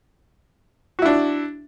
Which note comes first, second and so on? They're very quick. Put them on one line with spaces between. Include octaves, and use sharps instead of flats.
F#4 E4 D4